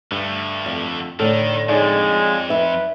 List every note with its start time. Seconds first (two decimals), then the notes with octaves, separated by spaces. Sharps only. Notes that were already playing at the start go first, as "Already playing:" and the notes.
0.12 G2 D3 A3
0.66 F2
1.20 A2 D3 D#3 A4
1.69 F2 G#3 D#4 C#5 D5
2.12 F4
2.50 B4 E5